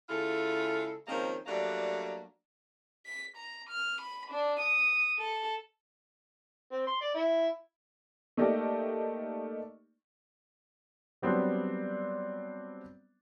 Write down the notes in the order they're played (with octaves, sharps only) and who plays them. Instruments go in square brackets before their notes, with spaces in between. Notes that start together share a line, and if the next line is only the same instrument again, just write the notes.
[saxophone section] C#3 G#3 E4 F4 A4
D#3 F3 G#3 A#3 C4 C#4
F#3 G3 A3 A#3 D4
[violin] B6
A#5
F6
B5
D4
D#6
A4
[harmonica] C4
C6
D5
E4
[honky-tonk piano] A3 A#3 D#4 G4 D5 D#5
[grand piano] F#3 G3 B3 C4 D4